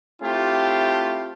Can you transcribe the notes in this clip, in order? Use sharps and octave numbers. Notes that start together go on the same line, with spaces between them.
A3 C4 E4 F4 G4